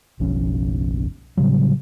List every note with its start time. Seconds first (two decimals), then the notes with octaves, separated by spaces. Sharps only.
0.19 F#1 B1 F3 C#4
1.37 A2 C#3 F#3 G3